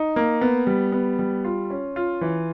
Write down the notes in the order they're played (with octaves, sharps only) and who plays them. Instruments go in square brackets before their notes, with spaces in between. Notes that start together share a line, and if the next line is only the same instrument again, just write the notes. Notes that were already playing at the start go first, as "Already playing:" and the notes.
Already playing: [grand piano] D#4
A#3
B3
G3
B3
G3
F4
C#4
F4
E3